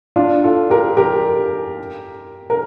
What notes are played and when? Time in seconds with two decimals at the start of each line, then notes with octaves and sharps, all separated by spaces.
0.16 D4 F4
0.44 F4 A4
0.70 G4 A#4
0.97 G4 A#4
2.50 A#4